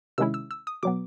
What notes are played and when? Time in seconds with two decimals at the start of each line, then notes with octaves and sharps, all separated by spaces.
0.18 C3 D#3 G#3 C#4 E4 E6
0.34 E6
0.51 E6
0.67 D#6
0.83 B2 F#3 B3 D6